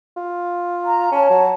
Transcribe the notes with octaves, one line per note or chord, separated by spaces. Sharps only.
F4
A#5
C#4 C#5 A5
F#3